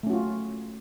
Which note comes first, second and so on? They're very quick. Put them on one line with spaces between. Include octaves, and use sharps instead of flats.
A3 C#4 F#4 F4